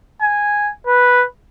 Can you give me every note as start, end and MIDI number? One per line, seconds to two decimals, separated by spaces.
0.22 0.70 80
0.87 1.25 71